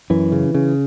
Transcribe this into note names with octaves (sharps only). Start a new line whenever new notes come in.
F#2 E3
C#3
C#3